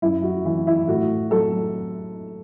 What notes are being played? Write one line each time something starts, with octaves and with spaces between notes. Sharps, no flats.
F#2 E4
F#4
E3 E4
E4
A2 F#4
F#3 A4